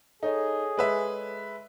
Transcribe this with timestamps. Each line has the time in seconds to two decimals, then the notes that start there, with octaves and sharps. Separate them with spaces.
0.23 D#4 G#4 A4 C#5 D#5
0.77 G#3 B4 E5